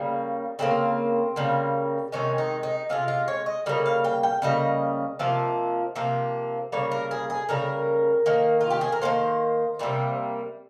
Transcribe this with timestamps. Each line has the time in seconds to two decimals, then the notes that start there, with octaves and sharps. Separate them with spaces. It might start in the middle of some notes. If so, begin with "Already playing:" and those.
Already playing: C#3 G3 A#3
0.59 C#3 G3 A#3 C4
1.36 C#3 G3 A#3
2.12 C3 D#3 G#3 C#4
2.38 D#4
2.63 D#4
2.89 C3 D#3 G#3 F4
3.08 F4
3.28 C#5
3.46 D#5
3.66 C#3 G3 A#3 D#5
3.86 F5
4.05 G5
4.23 G5
4.42 C#3 G3 A#3 D#5
5.19 C3 F3 A#3
5.96 C3 F3 A#3
6.72 C#3 G3 A#3 C#5
6.91 A#4
7.11 G#4
7.30 G#4
7.49 C#3 G3 A#3 A#4
8.26 D#3 A#3
8.61 F4
8.70 G4
8.81 G#4
8.92 A#4
9.02 D#3 A#3 C5
9.79 C3 G3 A#3